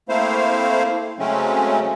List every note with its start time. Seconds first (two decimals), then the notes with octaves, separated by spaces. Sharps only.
0.09 A3 A#3 C4 E4 C5 F5
1.19 C#3 F#3 G#3 A3 C4 C#4